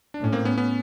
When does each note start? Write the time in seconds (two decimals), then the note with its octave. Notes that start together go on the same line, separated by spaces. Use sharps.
0.14 D4
0.21 A2 C#4
0.32 A#3 C4
0.45 B3 C#4
0.58 B3 C#4